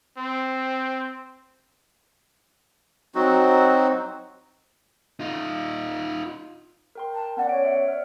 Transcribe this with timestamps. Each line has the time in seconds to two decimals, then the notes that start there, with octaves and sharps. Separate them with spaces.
0.17 C4
3.15 F#3 C4 D#4 F#4
5.20 D#4 F4
6.95 A#4 G5 C6
7.12 A5
7.37 B3 C#4 D5 F#5
7.49 C#5 D7
7.64 E5 F#5
7.88 D5 F6